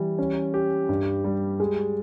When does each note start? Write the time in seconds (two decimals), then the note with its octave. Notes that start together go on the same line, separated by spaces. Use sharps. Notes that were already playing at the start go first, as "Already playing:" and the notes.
Already playing: E3 G3
0.18 C#4
0.54 G4
0.89 G2
1.24 G3
1.60 G#3